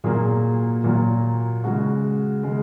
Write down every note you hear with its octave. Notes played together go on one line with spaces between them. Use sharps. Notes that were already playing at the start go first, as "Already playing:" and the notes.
A#2 F#3 A#3 G#4
A#2 F#3 A#3
C#3 G#3 F#4
C#3 G#3